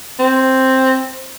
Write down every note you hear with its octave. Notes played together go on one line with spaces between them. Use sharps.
C4